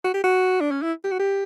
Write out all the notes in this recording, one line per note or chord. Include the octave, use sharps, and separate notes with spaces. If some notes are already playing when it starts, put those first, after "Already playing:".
F#4
G4
F#4
D4
C#4
E4
G4
F#4
G4